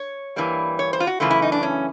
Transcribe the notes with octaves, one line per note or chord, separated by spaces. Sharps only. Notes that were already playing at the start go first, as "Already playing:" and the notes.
Already playing: C#5
G2 E3 G3 A#3
C#5
C5
F4
F#4
F#2 C#3 E3 A3 F4
E4
D#4
D4
C#4